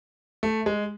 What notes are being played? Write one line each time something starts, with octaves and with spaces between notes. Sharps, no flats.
A3
G#3